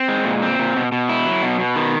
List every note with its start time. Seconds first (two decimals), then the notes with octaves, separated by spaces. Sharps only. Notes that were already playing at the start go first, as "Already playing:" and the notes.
Already playing: C4
0.08 G#3
0.25 A#2
0.42 C4
0.59 A#2
0.76 B2
0.92 B2
1.09 E4
1.26 F#3
1.42 B2
1.60 B2
1.76 D#3